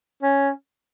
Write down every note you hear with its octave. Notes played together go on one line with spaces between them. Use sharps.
C#4